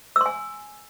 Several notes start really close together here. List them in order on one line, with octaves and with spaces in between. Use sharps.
E6 C6 G#5